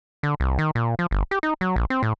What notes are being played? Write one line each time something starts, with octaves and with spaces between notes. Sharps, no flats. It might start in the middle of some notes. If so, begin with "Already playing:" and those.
D3
C2
D#3
A#2
F3
G1
G4
D#4
F#3
A#1
C4
A2